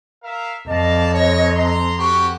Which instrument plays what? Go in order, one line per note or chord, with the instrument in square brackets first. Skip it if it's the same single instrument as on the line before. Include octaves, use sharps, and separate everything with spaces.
[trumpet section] A#4 E5 F5
[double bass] F2 [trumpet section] D5 F5 A5 [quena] D#5
[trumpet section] C#5
A#5 C6
[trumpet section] B3 F#4 G4 [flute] C#6